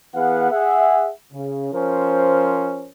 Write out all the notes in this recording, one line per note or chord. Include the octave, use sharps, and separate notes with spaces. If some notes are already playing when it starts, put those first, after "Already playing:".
E3 B3 G#4 F5 F#5
G#4 E5 F#5
C#3
F3 C#4 A#4 C5